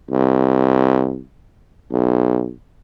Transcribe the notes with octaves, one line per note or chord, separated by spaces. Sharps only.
C2
B1